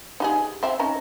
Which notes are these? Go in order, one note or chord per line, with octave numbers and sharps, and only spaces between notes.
D#4 G4 G#4
C4 E5 F5
C#4 D#4 A#5